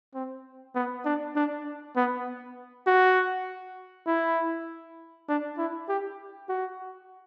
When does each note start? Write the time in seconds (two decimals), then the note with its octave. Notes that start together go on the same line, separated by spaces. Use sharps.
0.14 C4
0.75 B3
1.05 D4
1.35 D4
1.96 B3
2.87 F#4
4.07 E4
5.28 D4
5.58 E4
5.88 G4
6.49 F#4